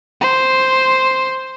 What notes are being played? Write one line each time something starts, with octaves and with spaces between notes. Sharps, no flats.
C5